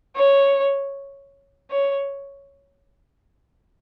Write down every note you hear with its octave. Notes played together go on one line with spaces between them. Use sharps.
C#5
C#5